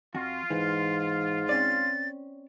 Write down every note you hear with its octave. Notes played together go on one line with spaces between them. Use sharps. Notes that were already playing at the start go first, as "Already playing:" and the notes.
F2 F4 F#4
G#2 E3
C4 C#4 D5 A6